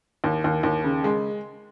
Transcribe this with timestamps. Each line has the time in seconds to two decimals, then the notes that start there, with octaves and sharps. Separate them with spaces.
0.24 D#2
0.44 D#2
0.63 D#2
0.84 C#3
1.04 G#3